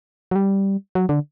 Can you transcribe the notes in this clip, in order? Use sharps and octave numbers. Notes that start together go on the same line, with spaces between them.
F#3
G3
F#3
D3